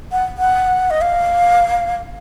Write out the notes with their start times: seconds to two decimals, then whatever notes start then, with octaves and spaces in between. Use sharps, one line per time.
0.12 F#5
0.38 F#5
0.91 D#5
1.01 F5